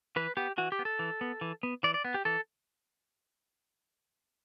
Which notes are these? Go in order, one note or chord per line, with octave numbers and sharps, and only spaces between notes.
E3 B4
B3 G4
E3 F#4
G4
B3
A4
E3
B3
E3
B3
E3 D5
D5
B3
G4
E3 A4